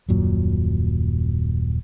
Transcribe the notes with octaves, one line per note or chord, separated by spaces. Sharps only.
D#1 F#2 A#2 F#3